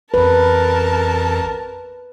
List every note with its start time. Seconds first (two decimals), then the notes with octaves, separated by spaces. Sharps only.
0.14 A1 F2 A#4 B4 A5